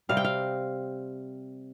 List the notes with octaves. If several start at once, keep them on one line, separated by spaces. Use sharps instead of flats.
C3 G3 C4 F5
G5
F5